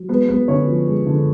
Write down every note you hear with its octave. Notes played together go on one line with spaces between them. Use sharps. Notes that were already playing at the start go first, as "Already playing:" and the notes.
Already playing: F#3
G#3 B3 B4
B3 B4
D3 C#4 C#5
F3
G#3
D3